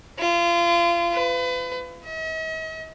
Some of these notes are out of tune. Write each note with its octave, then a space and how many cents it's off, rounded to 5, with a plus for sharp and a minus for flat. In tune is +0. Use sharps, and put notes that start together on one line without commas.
F4 -30
B4 +35
D#5 +45